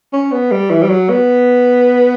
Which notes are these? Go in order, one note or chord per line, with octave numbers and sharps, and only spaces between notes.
C#4
B3
G3
E3
G3
F#3
B3